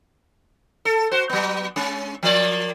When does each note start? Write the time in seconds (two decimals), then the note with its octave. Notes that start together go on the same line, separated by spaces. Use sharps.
0.85 A4
1.11 F#4 C5
1.29 F#3 B3
1.76 G#3 C#4
2.23 F3 A#3 D5